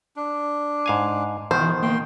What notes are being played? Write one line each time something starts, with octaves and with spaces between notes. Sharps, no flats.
D4
G#2 F5 G#5
B2 D#3 E3 C5
A#3 G5 C6